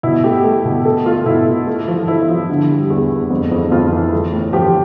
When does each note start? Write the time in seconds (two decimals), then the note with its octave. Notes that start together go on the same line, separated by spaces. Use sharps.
0.03 B2 E4
0.24 A3 G4
0.44 A3
0.65 B2
0.85 A3 A4
1.06 A3 F4
1.26 B2 E4
1.46 A3
1.67 A3
1.88 F3
2.08 F3 E4
2.28 F3
2.49 D3
2.70 G3
2.90 E2
3.10 E2
3.30 F2
3.52 F2
3.71 F2 F4
3.92 E3
4.13 A3
4.33 A2
4.53 F3 G4